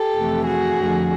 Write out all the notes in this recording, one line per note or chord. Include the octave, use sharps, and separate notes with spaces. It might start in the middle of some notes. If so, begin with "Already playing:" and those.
Already playing: G4 A4
F2 C3 E3 A3
F#4 G#4
F2 D3 F3 A3